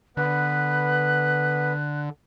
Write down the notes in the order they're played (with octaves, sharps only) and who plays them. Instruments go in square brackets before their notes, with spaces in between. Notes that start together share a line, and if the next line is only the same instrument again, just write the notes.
[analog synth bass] D3 [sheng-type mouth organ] B3 B4 [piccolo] F#6